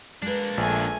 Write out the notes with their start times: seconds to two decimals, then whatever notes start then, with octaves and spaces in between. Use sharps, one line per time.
0.22 G#3 A#3 D4 A4 B4
0.58 A#1 A3 G#5